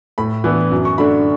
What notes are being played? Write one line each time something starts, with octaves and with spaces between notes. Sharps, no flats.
A2 B5
E3 B3 D4
F#2
C#6
D3 A3 D4 B5